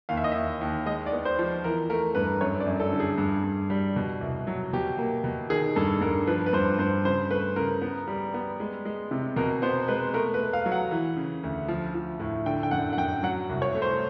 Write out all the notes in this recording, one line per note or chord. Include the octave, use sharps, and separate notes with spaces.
D#2 F5
E5
D#5
D#2 E5
D#2
G#3 D#5
D5
B3
C5
F3
E3 A#4
A3 A#4
G2 B4
F#2 C#5
D5
F#2
A4
D3
G#4
G2
G2
G3
B2
C2
F#3
B2 G4
A#3
B2
D#3 G#4
G2 A4
G2 A#4
F3 B4
B4
G2 C5
G2 C5
C#3 C5
A3 B4
C#3 A#4
B3
G3
B3
G#3
G#3
C3
B2 A#4
B3 C5
G#3 B4
A3 A#4
B4
A3
F5
F#3
F#5
E3
C#3
D2
F3
F3
A2
D3 G5
G5
F#2 F#5
F#5
F#2 G5
F#3 F#5
C2
C#5
A3
C5